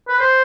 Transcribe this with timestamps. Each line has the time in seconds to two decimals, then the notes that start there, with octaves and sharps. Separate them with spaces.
0.08 B4
0.19 C5